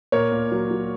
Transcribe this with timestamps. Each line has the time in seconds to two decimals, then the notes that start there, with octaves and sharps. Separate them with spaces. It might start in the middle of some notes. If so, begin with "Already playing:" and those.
0.12 A#2 A#4 C#5
0.32 A#2
0.52 F#3
0.71 F#3